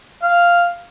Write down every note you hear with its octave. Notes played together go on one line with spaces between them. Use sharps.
F5